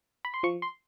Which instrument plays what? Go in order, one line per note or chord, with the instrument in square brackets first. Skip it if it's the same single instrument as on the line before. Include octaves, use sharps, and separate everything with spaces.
[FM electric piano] B5
C6
F3 C#6
C6